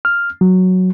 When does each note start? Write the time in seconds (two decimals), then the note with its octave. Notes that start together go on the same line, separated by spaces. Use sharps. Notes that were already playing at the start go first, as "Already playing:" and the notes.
0.05 F6
0.41 F#3